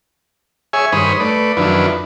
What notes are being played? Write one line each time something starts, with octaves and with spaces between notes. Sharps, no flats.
G#4 C#5 E5 G#5
G2 D#3 C5 C#5 B5 D#6
A3 B4 D5
F#2 D#3 F3 D4 E4 B4